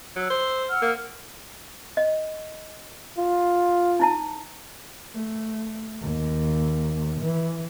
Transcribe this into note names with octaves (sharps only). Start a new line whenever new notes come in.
F#3 E6
C5
F#5 E6 F6
A#3
D#5
F4
D#4 E4 A5
A3
D#2
E3